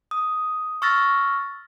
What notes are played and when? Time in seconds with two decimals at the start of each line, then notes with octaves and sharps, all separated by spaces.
0.11 D#6
0.82 C#6 E6 F6 A6 A#6